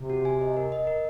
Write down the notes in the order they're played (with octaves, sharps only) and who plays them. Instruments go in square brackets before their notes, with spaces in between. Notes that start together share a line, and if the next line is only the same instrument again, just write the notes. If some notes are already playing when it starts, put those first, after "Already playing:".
Already playing: [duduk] C3
[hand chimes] F#4
G#5
D#5
A#4
D#5
A#4